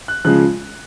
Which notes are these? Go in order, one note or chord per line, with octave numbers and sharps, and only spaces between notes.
F#6
C#3 F3 G#3 F#6